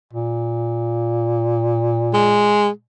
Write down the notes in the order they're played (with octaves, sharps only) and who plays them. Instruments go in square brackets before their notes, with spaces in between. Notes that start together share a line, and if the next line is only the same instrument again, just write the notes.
[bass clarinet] A#2
[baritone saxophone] G#3